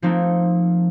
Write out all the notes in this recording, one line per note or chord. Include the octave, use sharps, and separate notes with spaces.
F3 A3 A#3 C4 D#4 A#4